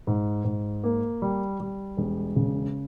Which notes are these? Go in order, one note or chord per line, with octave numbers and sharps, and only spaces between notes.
G#2
G#2
A#3
G3
G3
E1
C#3